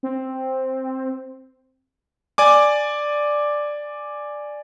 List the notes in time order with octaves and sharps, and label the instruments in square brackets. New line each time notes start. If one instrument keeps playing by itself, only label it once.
[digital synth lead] C4
[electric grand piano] D5 G#5 D6